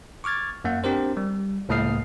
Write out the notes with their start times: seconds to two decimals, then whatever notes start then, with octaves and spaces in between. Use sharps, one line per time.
0.24 C#6 D6 F6 G#6 A6
0.64 F#2 A#3 F#5
0.84 C4 D4 G4 A#4 C5
1.17 G3
1.69 C#2 A2 A#3 D#6 F6 C7